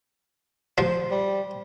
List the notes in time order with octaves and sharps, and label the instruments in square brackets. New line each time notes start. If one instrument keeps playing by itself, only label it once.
[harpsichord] F3 [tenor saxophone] C5
[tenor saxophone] G3